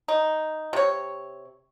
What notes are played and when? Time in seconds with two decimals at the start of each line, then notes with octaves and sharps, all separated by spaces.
0.08 D#4
0.73 C3 C#5